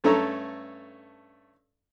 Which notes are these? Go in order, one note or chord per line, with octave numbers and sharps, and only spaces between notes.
G2 A3 C#4 A4 A#5 E6